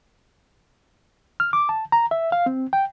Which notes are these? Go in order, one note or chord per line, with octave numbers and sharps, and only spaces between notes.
F6
D6
A5
A#5
E5
F5
C4
G5